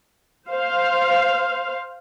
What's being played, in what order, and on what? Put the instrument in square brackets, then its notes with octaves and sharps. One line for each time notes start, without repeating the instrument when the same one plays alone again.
[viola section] C5 F5